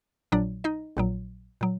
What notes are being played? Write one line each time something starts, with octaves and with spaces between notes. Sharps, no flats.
A#1 A#2 F#3 D4 D5
D#4 D#5
A#1 A#2 F#3
A#2 F#3